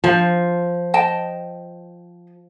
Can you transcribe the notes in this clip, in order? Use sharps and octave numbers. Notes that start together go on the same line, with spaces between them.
F3 C5 A5
D#5 G5 A5